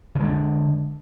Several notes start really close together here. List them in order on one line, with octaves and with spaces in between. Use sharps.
D3 G#3 D4